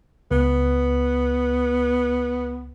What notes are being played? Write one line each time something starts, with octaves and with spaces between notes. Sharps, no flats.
C#2 B3